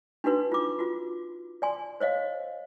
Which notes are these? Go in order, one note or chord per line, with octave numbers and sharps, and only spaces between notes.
D4 D#4 F#4 B4 C6
F4 D6
F4 F#4
D5 G#5 C6
C5 C#5 D#5 F5